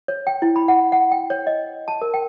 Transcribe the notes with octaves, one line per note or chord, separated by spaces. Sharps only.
C#5
G5
E4
B5
F#5
F#5
G5
C#5
D#5
A5
A#4
G5